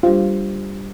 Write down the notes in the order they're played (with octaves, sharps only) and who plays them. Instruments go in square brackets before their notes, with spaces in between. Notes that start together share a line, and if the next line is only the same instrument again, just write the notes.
[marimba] G3 D4 G4 C5 [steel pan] F4